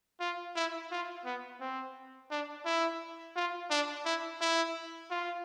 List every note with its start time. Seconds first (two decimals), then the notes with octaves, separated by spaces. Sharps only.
0.20 F4
0.56 E4
0.91 F4
1.25 B3
1.60 C4
2.31 D4
2.65 E4
3.36 F4
3.70 D4
4.05 E4
4.41 E4
5.11 F4